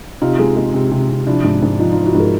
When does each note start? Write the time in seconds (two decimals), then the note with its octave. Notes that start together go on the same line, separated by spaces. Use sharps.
0.22 C3 D#4 F4
0.39 G#3
0.57 G#3
0.74 C3
0.91 C3
1.09 C3
1.27 F3 D4 E4
1.44 G#2
1.62 G#2
1.79 F3 D#4
1.92 D#4 F4
1.97 F3
2.06 E4 F#4
2.14 G#2 G#4 A#4